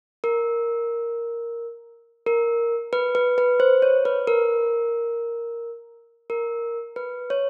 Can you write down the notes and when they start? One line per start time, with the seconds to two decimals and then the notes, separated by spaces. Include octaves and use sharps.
0.24 A#4
2.27 A#4
2.93 B4
3.15 B4
3.38 B4
3.60 C5
3.82 C#5
4.05 B4
4.27 A#4
6.30 A#4
6.96 B4
7.30 C#5